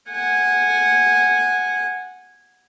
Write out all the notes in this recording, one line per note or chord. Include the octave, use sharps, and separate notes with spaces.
F#5 G#5